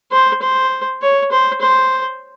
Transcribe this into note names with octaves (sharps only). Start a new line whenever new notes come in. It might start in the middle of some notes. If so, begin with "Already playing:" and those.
C5
C5
C#5
C5
C5